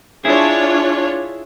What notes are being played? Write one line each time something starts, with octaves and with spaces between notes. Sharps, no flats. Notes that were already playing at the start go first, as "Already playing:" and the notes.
D4 E4 F4 G#4 C#5